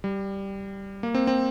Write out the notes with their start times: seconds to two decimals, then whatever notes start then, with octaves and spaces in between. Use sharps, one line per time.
0.04 G3
1.03 A#3
1.15 C4
1.27 C4